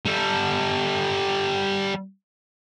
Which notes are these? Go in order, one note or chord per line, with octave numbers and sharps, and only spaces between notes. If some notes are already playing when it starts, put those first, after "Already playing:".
G3 A4